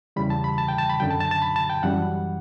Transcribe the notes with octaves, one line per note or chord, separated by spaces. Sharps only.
E2 C#3 E3 G3 B5
A5
B5
A5
G5
A5
B5
F#2 D3 F#3 G5
A5
A5
A5
B5
A5
G5
F#2 E3 G3 F#5